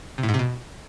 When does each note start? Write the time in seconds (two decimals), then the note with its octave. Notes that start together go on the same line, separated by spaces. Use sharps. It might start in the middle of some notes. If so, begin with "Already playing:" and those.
0.18 C3
0.23 A2
0.29 G#2
0.34 C3
0.39 B2